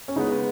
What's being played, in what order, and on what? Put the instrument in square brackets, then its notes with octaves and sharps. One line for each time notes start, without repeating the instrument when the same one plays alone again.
[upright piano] C#4
[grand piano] C#3 G#3 B3 [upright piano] D#4